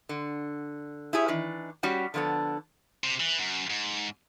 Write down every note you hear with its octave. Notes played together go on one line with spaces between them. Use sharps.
D3
E4 G4 G#4 C#5
D#3 E3 D4
G3 C#4 F#4 G4
D3 F3 B3 D4 A4
C3
E3
F#2
G#2